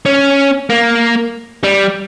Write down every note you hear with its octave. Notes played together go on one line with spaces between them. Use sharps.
C#4
A#3
G3